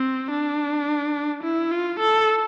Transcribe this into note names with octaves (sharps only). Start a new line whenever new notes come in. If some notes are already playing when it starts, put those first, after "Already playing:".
Already playing: C4
D4
E4
F4
A4